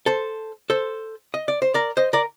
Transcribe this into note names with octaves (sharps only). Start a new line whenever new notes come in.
A4 C5
A4 C5
D#5
D5
C5
A#4 D5
C5 D#5
A#4 D5